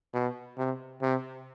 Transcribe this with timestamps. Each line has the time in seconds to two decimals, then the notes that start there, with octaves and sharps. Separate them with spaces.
0.14 B2
0.58 C3
1.02 C3